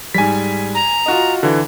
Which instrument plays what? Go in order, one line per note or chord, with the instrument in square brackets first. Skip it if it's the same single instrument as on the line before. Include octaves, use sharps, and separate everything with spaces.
[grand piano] G#2 G3 [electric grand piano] G#5 B6
[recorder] A#5
[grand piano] F4 F#4 D#5
[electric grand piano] D3 E3